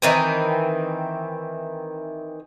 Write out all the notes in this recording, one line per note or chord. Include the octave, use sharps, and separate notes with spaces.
D#3 E3 C4